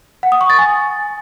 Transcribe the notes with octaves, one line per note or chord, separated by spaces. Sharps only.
F#5
D#6
C#6
A6
G#5